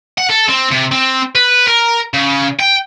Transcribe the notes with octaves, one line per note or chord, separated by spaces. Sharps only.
F#5
A4
C4
C3
C4
B4
A#4
C#3
G5